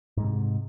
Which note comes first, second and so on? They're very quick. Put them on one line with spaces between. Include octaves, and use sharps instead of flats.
G#2 G#3 C3